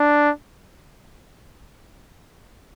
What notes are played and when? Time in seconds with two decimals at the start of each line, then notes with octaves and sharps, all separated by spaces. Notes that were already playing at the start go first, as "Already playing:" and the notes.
Already playing: D4